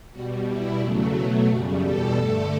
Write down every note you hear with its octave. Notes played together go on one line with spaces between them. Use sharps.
B2 G3 F#4
B2 G3 E4
E2 C#3 F#3 A3
B2 F#3 A3 E4
F#2 C#3 G3 F#4
E2 B2 G3 A4
G2 D3 A3 A4